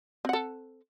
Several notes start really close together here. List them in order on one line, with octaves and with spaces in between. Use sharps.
C4 F#5 A4